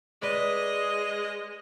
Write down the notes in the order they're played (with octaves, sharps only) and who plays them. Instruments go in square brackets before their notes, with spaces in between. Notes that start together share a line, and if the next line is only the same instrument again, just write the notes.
[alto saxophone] G#3 [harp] B4 D5 [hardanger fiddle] D#5